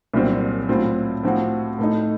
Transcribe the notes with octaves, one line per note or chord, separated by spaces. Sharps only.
C2 A#2 F#3 C4
A2 F#3 C4 F4
A2 F3 C4 F#4
A2 A3 D#4